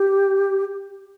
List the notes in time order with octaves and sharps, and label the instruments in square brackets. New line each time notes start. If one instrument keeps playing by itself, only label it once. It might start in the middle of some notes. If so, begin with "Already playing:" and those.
Already playing: [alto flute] G4